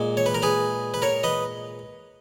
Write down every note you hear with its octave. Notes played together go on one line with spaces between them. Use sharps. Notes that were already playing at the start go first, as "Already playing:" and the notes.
Already playing: A#2 G#3
C#5
B4
A#4
G#4 B4
B4
A#4 C#5
B4 D#5